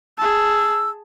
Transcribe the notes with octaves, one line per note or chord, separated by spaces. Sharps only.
G#4 A5 E6